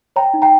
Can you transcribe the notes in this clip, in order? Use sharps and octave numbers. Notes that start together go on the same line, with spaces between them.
C#5 G5 A#5
D#4
G5 A#5